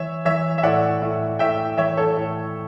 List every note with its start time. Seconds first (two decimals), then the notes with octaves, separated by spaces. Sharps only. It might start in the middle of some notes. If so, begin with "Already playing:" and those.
Already playing: E3 C#5 E5
0.25 E3 C#5 E5
0.58 E5
0.63 A2 D5 F#5
1.02 A2
1.39 A2 E5 G5
1.77 E3 C#5 E5
1.97 A4 C#5
2.17 A2